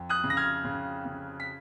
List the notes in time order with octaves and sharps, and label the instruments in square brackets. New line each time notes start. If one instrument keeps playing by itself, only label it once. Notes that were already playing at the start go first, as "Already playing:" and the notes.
Already playing: [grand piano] F2
D#6 F#6
C#3
A#6
F6 G#6
C#3
C#3
B6